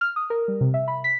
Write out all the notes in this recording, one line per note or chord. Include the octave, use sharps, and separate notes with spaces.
F6
D#6
A#4
G3
C3
E5
B5
B6